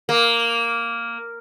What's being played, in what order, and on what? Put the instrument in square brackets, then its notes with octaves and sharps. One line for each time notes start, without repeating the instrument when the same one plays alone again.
[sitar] A#3